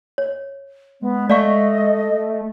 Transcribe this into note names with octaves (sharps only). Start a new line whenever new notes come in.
C#5
G#3 B3
A3 D5 D#5 F5 C#6